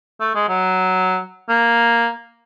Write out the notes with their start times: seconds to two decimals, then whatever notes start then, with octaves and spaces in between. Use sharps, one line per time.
0.20 A3
0.35 G#3
0.48 F#3
1.49 A#3